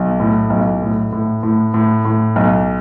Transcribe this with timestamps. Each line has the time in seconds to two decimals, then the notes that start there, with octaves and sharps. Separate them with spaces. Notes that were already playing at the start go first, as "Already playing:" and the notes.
Already playing: B1
0.20 A2
0.50 B1
0.82 A2
1.12 A2
1.43 A2
1.74 A2
2.05 A2
2.36 B1